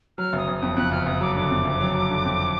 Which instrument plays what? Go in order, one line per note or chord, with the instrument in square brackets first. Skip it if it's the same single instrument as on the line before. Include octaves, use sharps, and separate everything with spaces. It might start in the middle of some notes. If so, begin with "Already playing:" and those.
[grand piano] F#3 [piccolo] F6
[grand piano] F#1 [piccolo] D#6
[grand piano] F#1
[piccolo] D#6
[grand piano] F2
[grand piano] F2 [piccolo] F#6
[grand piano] F#1 [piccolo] F6
[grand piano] F#1 [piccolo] D#6
[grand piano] F#3 [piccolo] D6
[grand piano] D3 [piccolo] D6
[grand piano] F2
F#1
F#3
F#3
D3
F2